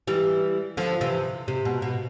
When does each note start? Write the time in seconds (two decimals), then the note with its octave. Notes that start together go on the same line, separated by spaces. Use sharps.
0.07 E3 G3
0.77 D3 F3
1.01 C3 E3
1.48 C3
1.65 B2
1.82 B2